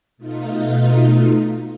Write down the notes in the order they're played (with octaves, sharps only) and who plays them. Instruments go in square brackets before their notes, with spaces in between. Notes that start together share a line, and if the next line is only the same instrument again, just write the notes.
[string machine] B2 A3 D#4 F4